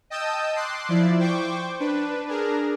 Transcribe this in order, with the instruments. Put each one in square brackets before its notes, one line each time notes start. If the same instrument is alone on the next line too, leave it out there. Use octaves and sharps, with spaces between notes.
[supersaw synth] D#5 G5 A5 D#6 E6 G6
C6 D6 F#6 C7
F3 E4 D5
C5 G5 C#6 D6
D4 B4
D4 G#4 A#4